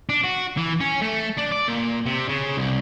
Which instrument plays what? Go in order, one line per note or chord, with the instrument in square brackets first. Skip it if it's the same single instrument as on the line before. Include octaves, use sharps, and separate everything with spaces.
[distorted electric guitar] D4
F#4
E3
C#4
A3
D4
D5
A#2
C3
C#3
C2